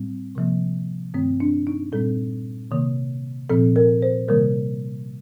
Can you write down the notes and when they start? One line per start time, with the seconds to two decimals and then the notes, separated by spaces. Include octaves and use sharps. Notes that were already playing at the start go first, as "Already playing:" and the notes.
Already playing: A2 G3 C4
0.35 C3 F3 A#3
1.14 G2 D#3 A3 C4
1.40 D4
1.67 D#4
1.92 A#2 G3 C4 A4
2.71 C3 D#3 A#3
3.50 A#2 F3 C4 A4
3.76 A#4
4.02 C5
4.28 C3 D#3 G3 A#3 A#4